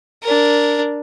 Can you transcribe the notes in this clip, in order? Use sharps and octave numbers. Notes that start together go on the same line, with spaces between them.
D4 A#4